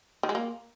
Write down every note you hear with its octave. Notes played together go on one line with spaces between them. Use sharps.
D#3
G#3
A#3